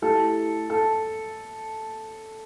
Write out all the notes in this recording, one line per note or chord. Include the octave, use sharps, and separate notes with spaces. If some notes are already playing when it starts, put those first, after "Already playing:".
A3 E4 G4 A4
A4